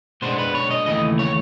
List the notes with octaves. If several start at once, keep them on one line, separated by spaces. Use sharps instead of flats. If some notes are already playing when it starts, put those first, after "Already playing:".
B2 G#3 B3 D4 C5
B4
C#5
D#5
D#2 C#3 E3 A3 D#5
C#5